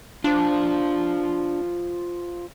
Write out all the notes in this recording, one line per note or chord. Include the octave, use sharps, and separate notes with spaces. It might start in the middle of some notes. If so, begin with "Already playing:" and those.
D4 F4 C5